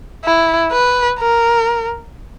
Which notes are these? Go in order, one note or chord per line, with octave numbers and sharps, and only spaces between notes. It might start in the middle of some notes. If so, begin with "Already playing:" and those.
E4
B4
A#4